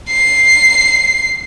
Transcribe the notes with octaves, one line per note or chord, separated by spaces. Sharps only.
C7